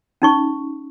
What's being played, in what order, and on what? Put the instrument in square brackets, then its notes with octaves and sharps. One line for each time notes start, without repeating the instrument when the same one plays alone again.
[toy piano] C#4 D#4 C#6